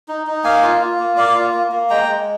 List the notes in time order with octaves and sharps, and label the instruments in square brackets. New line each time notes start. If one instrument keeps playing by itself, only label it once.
[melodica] D#4
D#4
A#3 F5 G#5
F4
F4
A#3
A#3 D5 F5
F4
A#3
A#3
G#3 G5 A#5
G#3